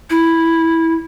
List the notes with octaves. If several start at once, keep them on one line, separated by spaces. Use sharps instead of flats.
E4